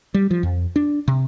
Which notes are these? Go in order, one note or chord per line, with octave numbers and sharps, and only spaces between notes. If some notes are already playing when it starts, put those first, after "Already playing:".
G3
F3
F2
D4
C3